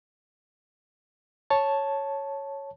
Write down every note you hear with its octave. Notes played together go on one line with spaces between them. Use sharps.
C#5 A5